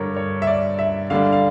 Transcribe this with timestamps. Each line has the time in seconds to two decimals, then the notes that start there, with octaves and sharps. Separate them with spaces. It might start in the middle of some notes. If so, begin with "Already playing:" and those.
Already playing: G2 D3 G3 A#4 C#5
0.17 C#5
0.42 E5
0.47 D5
0.79 E5
1.10 D3 G3 D4 F5
1.32 F5